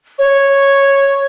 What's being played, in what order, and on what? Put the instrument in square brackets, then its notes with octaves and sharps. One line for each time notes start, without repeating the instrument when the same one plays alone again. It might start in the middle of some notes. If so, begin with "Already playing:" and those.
[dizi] C#5